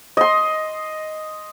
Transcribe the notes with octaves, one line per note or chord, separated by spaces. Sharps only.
D#5 C6